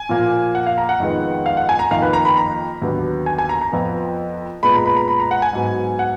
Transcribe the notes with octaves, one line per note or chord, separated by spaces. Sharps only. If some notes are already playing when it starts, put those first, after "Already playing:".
Already playing: G#5
A#2 F3 A#3
F#5
F5
A#5
F#5
F2 D#3 G#3 B3
F5
F#5
G#5
A#5
F2 D#3 A#3 F5
B4
A#5
B5
A#5
D#2 D3 F#3 B3
G#5
G#5
A#5
A#5
F2 F3 B3
A#2 G#3 B3 B5
A#5
B5
A#5
B5
A#5
F#5
G#5
G#2 F#3 B3
F#5